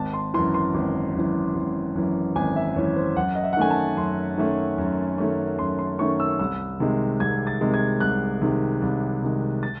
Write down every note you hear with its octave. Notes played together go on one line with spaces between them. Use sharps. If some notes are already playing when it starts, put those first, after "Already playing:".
Already playing: G#1 A5
C6
F#2 E3 C6
C6
G#1
F#2 E3
G#1
F#2 E3
G#1 G#5
E5
F#2 E3 C#5
C5
F#2 F#5
D#5
E5
F#5
D#3 A3 C#4 G#5
A5
F#2 C6
D#3 A3 C#4
F#2
D#3 A3 C#4
F#2 C6
C6
D#3 A3 C#4 C#6
E6
C2 E6
C3 D#3 G#3
C2 G#6
A6
C3 D#3 G#3
G#6
C2 F#6
C3 D#3 G#3
C2
C3 D#3 G#3
A6